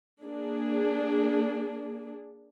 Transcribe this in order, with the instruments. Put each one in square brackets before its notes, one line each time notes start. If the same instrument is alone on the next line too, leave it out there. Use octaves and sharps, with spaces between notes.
[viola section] A#3 D4 G#4